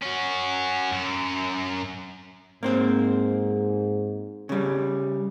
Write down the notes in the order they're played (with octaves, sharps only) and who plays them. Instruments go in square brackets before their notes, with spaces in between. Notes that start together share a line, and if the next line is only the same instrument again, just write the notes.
[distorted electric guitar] C#4 F#4
F#2
[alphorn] G#2 [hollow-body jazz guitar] A#3 C4 C5
[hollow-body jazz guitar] C#3 G3